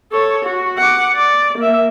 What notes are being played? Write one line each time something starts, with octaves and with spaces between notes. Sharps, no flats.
A4 C#5
F#4
F#5 D6
D5
A#3 E5